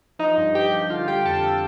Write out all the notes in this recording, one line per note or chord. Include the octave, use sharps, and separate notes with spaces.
F3 D#4 D#5
G2
G2 G4 G5
F3
D3 F4 F5
G3 G4 G5
F2 A4 A5
A4 A5